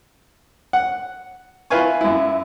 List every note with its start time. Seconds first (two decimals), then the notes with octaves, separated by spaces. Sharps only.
0.73 F#5
1.70 E4 F4 B4 F5 G#5 C#6
2.01 F#2 E4